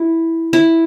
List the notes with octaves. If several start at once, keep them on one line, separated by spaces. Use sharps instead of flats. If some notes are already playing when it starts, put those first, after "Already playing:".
Already playing: E4
E4